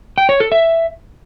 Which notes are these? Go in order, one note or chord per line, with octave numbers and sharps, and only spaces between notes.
G5
C#5
A4
E5